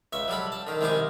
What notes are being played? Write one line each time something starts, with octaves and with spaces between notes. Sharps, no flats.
C#2 E5 C#6
F#3 G3 A4 B5
A5
D3 D#3
C2 D#3 G#3 D#4 G#4 D6